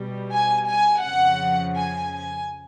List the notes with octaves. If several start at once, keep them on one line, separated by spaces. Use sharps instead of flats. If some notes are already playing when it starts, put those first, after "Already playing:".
Already playing: B2 G3
G#5
G#5
F2 C#3 F3 F#5
G#5
G#5